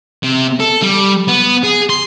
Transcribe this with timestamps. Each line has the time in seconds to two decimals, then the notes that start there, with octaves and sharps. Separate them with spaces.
0.24 C3
0.60 A4
0.82 G3
1.28 B3
1.64 G#4
1.90 C6